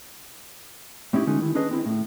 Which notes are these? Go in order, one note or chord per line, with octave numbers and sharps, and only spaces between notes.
A2 C4 C#4 D#4 E4 G4
D3 G#3 C#4 D#4 F4 F#4
D#3 E4
C#4 D4 G#4 B4 D#5
C4 E4
A2